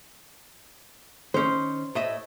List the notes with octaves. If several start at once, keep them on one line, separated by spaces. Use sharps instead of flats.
D#3 C#4 C5
A2 D#5 E5